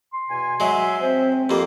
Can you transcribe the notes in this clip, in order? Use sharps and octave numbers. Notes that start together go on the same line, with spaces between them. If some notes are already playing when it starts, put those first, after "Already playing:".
C6
E2 B2 G#5
F#3 G#3 E5 G#5
C4 C5
F2 A#3 G4 A#4 B5 C6